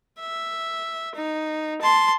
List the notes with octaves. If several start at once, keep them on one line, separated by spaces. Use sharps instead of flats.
E5
D#4
A5 C6